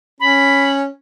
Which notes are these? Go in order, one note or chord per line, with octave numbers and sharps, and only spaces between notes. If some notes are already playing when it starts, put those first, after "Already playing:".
C#4 B5